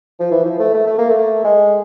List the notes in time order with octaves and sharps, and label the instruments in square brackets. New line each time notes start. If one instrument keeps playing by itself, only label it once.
[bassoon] F3
E3
F3
A3
A3
A3
A#3
A3
G#3